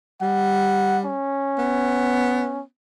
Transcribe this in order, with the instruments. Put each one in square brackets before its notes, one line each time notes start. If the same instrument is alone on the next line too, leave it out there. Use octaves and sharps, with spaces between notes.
[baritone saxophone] G3 [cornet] F#5
[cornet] C#4
[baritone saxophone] B3